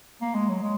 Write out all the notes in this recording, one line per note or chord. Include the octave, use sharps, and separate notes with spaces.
A#3
G#3
F#3
G#3